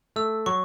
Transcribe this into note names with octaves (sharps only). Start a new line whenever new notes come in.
A3 E6
F#3 C#6